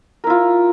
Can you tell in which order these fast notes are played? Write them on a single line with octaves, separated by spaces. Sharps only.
A#4 E4 F4